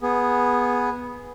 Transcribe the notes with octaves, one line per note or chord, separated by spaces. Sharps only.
B3 G#4